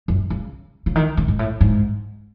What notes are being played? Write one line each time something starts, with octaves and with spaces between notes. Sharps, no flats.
F#2
C#3
C#3
D#3
C#3
G#2
A2
G#2